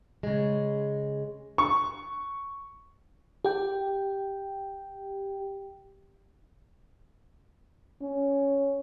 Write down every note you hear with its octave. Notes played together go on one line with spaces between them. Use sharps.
C#3 G#3
C#6
G4 G5
C#4